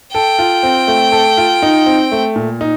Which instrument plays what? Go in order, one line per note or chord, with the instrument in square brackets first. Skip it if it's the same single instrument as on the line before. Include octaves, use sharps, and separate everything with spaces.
[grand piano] A4 [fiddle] G5
[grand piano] F4
C4
A3
A4
F4
D#4
C4
A3
A#2
D#4